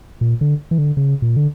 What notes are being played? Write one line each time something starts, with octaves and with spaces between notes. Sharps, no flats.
A#2
D3
E3
D3
C#3
A#2
D3